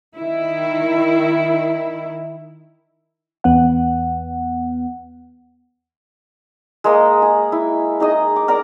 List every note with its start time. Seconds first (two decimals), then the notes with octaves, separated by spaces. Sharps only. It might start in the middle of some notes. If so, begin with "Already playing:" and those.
0.16 D#3 E4
3.44 E2 B3 F#5
6.84 G#3 A#3 D#5
7.22 G#4
7.52 E4
8.00 D#4 G#4 D#5
8.36 D6
8.48 A#4 D5 A#5